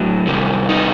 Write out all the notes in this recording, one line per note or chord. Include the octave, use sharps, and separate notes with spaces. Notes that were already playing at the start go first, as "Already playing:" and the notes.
Already playing: A2 F#3
C3 D#3 G3
D#4